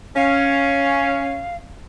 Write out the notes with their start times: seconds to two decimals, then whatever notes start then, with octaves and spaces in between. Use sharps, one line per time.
0.16 C#4 F5